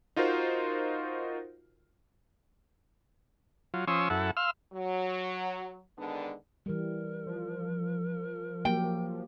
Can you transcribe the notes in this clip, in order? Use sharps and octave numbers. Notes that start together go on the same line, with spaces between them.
D#4 F4 F#4 A#4 C5
F#3 F4
F3 C#4 C6 C#6 D#6 E6
F#2 E4 A4 F#5
F5 C6 E6 F6
F#3
D3 D#3 G#3 B3 D4
E3 G3 A#4
F3
F#3 A#3 G4 G5